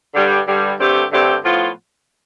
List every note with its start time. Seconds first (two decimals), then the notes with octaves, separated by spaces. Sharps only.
0.15 G2 D3 G3
0.47 G2 D3 G3
0.79 G2 D3 A3 C4 G4
1.11 G2 D3 A3 C4 G4
1.43 A2 F3 B3 F4